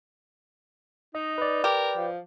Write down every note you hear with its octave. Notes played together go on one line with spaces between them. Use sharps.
D#4 D#5
B4 D5
G4 A#4
F3